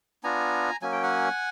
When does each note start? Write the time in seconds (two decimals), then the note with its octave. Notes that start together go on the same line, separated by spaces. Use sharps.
0.23 B3 D4 F4 G#5 A#5
0.82 F#3 A#3 C#4 G#5
0.92 G5
1.03 F#5 G#5